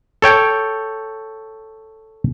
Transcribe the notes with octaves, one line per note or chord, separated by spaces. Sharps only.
A4 C#5 G5